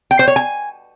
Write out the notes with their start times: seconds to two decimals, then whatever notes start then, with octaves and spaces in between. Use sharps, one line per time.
0.11 G5
0.19 C5
0.28 C#5
0.36 G#5